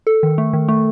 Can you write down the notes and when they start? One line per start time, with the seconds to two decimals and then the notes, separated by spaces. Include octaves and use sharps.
0.07 A4
0.23 D#3
0.38 A3
0.53 D#3
0.68 A3